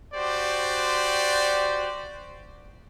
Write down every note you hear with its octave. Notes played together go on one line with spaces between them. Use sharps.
F#4 G4 C5 D5